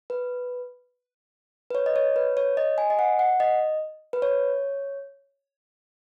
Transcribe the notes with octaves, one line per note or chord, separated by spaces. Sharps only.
B4
B4
C#5
D#5
C#5
B4
C#5
D#5
G#5
D#5
F#5
F#5
D#5
B4
C#5